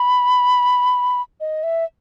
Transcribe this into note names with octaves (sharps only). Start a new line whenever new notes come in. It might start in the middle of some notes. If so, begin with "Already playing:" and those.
Already playing: B5
D#5
E5